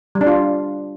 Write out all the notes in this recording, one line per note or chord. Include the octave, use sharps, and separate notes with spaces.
G3
D4
F4